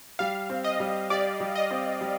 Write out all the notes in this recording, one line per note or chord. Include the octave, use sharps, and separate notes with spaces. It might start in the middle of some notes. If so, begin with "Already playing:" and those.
G3 F5
C4
D#5
G3
G4 D5
G3
D#5
C4
G3